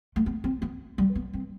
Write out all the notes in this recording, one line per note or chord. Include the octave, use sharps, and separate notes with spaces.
A3
B3
C4
B3
G3
B3
C4